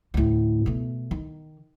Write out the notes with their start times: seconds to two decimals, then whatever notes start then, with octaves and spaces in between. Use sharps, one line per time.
0.14 D2 A2
0.66 B2 A3
1.11 D#3